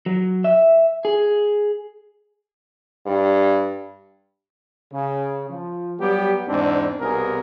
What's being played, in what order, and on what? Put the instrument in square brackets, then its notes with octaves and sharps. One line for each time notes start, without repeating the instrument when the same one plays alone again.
[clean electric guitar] F#3
E5
G#4
[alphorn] G2
[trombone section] C#3
F3
F#3 G3 B3 G4
E2 G#2 C4 D4
C2 B2 B3 G#4 A#4